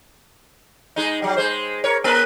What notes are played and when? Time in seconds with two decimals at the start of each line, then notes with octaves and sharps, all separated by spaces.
0.96 G#3 D#4
1.22 F#3 G3
1.37 G#3 C5
1.84 A#4 C#5
2.04 A#3 A#4 B4